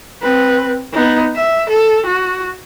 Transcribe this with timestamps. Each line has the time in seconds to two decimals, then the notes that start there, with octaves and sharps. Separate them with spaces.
0.22 C4 B4
0.93 B3 D#4
1.35 E5
1.70 A4
2.07 F#4